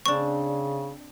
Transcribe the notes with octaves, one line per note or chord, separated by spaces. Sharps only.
C#3 C4 D4 C#6